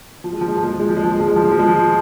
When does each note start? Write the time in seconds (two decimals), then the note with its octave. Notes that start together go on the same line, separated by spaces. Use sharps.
0.24 F3
0.33 G#3
0.41 F3
0.48 G#3
0.57 F3
0.64 G#3
0.72 F3
0.80 G#3
0.89 F3
0.97 G#3
1.05 F3
1.11 G#3
1.20 F3
1.28 G#3
1.36 F3
1.44 G#3
1.51 F3
1.59 G#3
1.68 F3